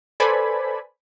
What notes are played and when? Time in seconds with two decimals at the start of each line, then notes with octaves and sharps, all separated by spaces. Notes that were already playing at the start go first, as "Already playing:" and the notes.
0.20 A4 B4 C5 D5 G#5 B5